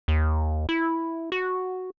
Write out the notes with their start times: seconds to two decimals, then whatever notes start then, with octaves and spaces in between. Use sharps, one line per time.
0.08 D#2
0.69 E4
1.32 F#4